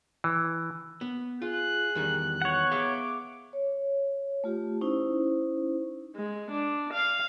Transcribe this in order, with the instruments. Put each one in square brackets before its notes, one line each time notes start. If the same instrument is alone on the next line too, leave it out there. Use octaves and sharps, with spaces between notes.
[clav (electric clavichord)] E3
[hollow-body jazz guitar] B3
[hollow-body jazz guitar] F4 [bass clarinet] G#4 [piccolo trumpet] F#6
[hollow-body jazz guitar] E2 D#3 G3
[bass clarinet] B3 [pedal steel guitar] C#5 F#5
[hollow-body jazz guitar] G#4 E5 F5 [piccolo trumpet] D6
[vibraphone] C#5
A3 F4 G4
C#4 D#4 E4 C5
[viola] G#3
D4
F5